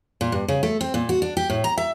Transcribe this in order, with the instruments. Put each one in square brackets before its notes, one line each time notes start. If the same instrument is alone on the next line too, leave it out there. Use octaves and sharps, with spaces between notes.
[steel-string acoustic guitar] A#2
G2
C#3
A3
C4
A#2
F#4
D4
G4
A2
A#5
E5